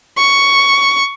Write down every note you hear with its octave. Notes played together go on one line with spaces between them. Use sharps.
C#6